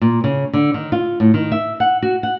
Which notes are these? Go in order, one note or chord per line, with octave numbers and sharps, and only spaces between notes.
A#2
C#3
D3
D#3
F4
A2
D#3
E5
F#5
F#4
F#5